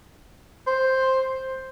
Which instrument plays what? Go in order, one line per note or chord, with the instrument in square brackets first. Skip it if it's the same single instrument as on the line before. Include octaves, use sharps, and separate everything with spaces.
[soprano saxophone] C5